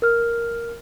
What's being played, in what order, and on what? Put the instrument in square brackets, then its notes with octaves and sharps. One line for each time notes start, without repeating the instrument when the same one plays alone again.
[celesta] A#4 F6